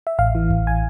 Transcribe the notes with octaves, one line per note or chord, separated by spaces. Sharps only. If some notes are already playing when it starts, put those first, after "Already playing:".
E5
A1 F5
E3
A1
G#5